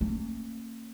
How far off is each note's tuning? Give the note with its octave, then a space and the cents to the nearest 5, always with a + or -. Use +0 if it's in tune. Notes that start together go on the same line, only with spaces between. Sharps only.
A#3 -45 C#4 -35